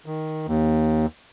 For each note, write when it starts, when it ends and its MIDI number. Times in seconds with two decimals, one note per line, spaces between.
0.06 0.46 51
0.47 1.06 39